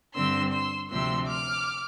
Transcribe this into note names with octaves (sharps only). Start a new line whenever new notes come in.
G2 D3 G3 C4 C6 E6
C6 E6
D2 C3 F3 C4 C6 E6
D6 F6